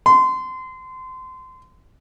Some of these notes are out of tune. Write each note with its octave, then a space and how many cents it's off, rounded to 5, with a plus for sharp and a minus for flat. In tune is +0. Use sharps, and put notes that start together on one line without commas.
C6 -25